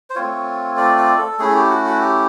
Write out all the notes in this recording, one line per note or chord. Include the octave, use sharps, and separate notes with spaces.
C5
A3 C4 F4 C#5
D5
D5
A4
A3 C#4 E4 G#4
G4
F#4
F#4
G4